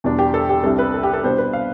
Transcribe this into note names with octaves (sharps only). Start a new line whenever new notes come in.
E2 B2 G3 D4
G4
A4
G4
C2 C3 G3 D4 A4
B4
A4
G4
A4
B2 G3 B3 D4 C5
B4
F5